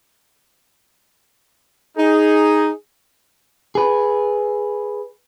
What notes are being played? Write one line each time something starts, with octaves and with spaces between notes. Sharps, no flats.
D#4 G#4
G#4 B4